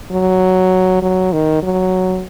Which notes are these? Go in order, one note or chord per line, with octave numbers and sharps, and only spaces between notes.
F#3
F#3
D#3
F#3